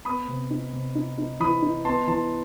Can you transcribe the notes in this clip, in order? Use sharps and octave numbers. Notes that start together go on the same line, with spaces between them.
B3 B5 D#6
C3
D#4
C3
D#4
D#4
E3 B5 D#6
D#4
B3 A5 C6
E3 A5 C6